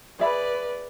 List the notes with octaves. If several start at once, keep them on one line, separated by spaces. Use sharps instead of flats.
G#4 B4 D5 E5 B5